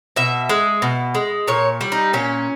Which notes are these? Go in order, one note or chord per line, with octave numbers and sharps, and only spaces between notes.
B2 E5
G#3
B2
G#3
A#2 C#5
G3
D#4
A#2 C#4